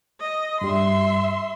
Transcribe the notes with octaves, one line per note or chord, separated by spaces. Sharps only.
D#5
G2 G3 E5 C6